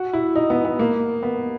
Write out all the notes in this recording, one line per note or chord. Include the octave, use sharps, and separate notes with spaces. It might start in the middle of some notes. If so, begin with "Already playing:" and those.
Already playing: F#4
E4
D#4
B3
B3
A#3
B3